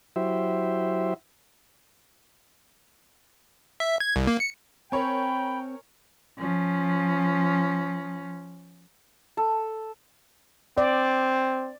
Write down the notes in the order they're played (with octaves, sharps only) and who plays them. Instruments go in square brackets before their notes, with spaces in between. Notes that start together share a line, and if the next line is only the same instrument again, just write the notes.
[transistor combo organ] F#3 E4 G4 C5 E5
[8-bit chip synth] E5
G#6
C2
A#3
C#7
[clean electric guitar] C4 [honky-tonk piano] A#4 C#5 G#5 [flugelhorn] G5 [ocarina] B5
[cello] F3 C#4
[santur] A4
[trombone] C4 [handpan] D5